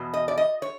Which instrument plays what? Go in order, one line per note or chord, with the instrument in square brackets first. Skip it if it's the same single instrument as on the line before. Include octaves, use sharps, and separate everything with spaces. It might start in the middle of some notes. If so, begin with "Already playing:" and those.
Already playing: [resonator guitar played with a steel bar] E2 B2
D#5
D5
D#5
C#5